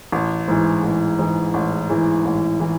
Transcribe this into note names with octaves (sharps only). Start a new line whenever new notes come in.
A1
G#2 E3
A1
G#2 E3
A1
G#2 E3
A1
E3